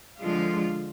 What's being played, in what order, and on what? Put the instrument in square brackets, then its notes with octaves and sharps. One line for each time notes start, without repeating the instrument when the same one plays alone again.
[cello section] D3 F3 G#3 F4